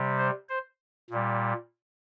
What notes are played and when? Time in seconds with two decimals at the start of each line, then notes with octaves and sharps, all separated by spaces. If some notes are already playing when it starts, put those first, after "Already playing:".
Already playing: C3 G3
0.18 C5
0.49 C5
1.10 A#2 G3